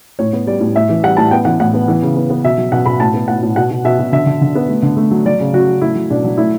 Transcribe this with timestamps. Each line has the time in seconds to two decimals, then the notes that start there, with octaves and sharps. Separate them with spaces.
0.19 A2 C#5
0.33 B3
0.47 G3 D5
0.60 A2
0.75 A2 E5
0.89 E3
1.03 G3 F#5
1.17 A2 A5
1.31 B3 G5
1.45 E3 F#5
1.60 A2 F#5
1.74 B3
1.88 E3
2.02 C#3
2.16 B3
2.30 B3
2.44 B2 E5
2.58 F#3
2.72 B2 F#5
2.86 B2 B5
3.00 A2 A5
3.14 B3
3.28 A2 F#5
3.42 A2
3.56 B2 F#5
3.71 B2
3.84 B2 E5
3.99 B2
4.12 D3 E5
4.26 D3
4.42 D3
4.55 B3
4.69 A3
4.83 D3
4.97 A3
5.11 F#3
5.26 F#3 D5
5.40 C#3
5.53 F#3 F#4
5.67 F#3
5.81 A3 E4
5.95 F#3
6.10 B2 D4
6.24 F#3
6.37 A3 E4